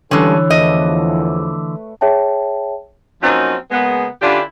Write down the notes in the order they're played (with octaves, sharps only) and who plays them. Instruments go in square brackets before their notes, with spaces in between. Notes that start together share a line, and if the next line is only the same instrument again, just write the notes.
[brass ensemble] G2 A4 [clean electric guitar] D3 E3 [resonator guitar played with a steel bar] G#3 C#4 [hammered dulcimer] C#5
[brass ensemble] E2 F3 [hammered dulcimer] A3 B4 [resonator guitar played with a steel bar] D#5
[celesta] G#4 C#5 E5 G5 A5
[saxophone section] F3 F#3 A#3 C4 C#4 D#4
C#3 G#3 A#3 B3
D3 C#4 D4 E4 F4 G4